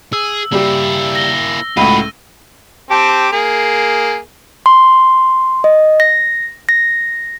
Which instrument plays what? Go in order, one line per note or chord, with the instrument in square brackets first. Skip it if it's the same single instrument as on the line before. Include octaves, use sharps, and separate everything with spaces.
[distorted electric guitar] G#4 [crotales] E6
[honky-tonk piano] G3 G4 [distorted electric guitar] A#3 E4
[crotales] A#6 G7
[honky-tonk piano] C#2 A2 [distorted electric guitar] F4 F#4 [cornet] B5 [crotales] D#7
[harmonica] C4 G4 A5
A#3 G#4
[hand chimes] C6
D#5
A#6
A#6